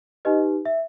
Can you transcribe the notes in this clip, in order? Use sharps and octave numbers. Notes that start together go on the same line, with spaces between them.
D#4 G4 B4 D#5
E5